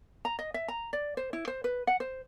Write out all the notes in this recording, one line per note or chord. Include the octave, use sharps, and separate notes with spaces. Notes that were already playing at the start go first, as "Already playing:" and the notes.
A#5
D#5
E5
A#5
D5
C5
E4
C5
B4
F#5
C5